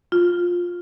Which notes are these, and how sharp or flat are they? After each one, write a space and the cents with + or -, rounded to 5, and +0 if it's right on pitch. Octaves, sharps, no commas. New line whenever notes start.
F4 +10